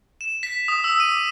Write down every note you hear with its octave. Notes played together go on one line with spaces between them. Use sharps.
E7
B6
D#6
E6
D#7
D6